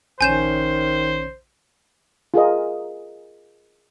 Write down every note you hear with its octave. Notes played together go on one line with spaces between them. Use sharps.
A#1 D#3 C#4 C5 C#5 G#5 G6 E7
F4 G#4 A#4 D#5